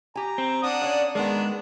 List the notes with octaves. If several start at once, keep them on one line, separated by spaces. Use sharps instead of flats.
G4 G#5 A#5
C4
D4 F#5 D#6
C#4 C#5 D5 F5
D#3 G#3 B3 D4 A#4